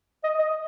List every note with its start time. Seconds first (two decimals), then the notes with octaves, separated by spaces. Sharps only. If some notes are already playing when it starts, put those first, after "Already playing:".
0.24 D#5
0.39 D#5